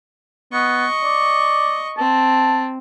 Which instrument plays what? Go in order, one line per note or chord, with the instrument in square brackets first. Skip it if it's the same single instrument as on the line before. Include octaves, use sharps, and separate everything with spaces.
[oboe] B3 [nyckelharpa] D#5 C#6
[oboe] D5
[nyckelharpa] C4 [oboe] A5